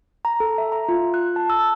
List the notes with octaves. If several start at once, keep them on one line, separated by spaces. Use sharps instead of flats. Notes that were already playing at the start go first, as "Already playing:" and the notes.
A#5
A4
E5
A#5
F4
F#6
A5
E6